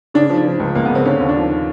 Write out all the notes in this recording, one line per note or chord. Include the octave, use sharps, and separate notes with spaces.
C#3 D4
F3
D4
F3
C#2
C#2 A#3
B3
C#3 C4
D3 C#4
D#2
D4
F3